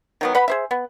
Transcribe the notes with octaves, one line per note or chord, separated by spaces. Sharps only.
D#3 F#3 B3
B4 F#5 B5
G#4 C5 E5
B3